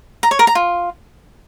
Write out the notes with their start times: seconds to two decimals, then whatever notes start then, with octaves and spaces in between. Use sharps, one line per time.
0.23 A#5
0.31 C#5
0.39 A#4
0.47 A#5
0.55 F4